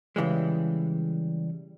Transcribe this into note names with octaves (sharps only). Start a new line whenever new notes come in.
C#3 E3 G3 G#3